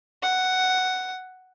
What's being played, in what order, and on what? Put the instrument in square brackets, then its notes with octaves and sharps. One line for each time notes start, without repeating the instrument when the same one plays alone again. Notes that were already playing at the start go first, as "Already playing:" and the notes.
[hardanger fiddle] F#5